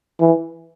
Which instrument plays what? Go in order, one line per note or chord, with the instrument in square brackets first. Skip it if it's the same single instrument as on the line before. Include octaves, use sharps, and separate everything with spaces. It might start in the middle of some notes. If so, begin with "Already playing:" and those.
[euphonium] E3